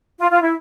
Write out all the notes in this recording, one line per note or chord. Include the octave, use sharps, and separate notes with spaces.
F4
F4
E4